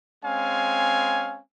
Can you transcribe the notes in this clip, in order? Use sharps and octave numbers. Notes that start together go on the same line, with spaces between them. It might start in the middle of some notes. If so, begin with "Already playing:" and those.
G#3 C4 C#4 F5 G#5